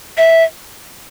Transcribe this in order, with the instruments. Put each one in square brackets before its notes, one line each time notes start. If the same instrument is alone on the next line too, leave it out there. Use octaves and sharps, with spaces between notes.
[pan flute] E5